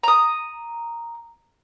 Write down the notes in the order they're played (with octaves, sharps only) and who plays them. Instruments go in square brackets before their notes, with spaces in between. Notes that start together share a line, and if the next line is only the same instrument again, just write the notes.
[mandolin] A#5 D#6